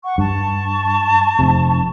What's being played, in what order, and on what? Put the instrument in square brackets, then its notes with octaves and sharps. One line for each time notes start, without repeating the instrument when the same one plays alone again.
[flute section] F#5 C#6
[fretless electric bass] G2 [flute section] A5 C#6
[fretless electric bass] F1 C3